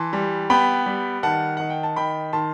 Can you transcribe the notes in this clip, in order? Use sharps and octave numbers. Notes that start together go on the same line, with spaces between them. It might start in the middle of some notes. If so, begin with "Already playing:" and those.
Already playing: E3 A5 C6
G3
B3 G5 B5
G3
D#3 F#5 A5
D#3 F#5
G5
A5
D#3 G5 B5
D#3 A5 C6